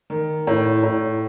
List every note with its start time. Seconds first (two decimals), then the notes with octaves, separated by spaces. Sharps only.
0.10 D#3
0.47 A2
0.83 A2